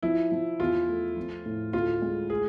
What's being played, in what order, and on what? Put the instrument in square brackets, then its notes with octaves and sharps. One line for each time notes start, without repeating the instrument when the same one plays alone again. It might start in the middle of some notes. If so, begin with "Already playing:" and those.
[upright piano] F3 [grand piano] E4
[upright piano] F3
[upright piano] E2 [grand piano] F4
[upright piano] A3
F3
A2
[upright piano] D2 [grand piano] F4
[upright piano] G#3
[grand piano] G#4